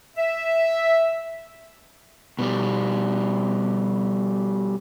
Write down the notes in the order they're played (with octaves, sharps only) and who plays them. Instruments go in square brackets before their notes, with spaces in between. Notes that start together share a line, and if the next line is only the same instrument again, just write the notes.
[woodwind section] E5
[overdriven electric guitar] B2 G3